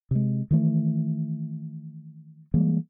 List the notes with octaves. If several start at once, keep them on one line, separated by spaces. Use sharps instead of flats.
C3 G#3
D#3 E3 A3
E3 G3 G#3 A#3